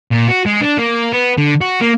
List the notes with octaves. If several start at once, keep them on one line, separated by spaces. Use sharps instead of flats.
A#2
F#4
G#3
D4
A#3
B3
D3
F#4
A#3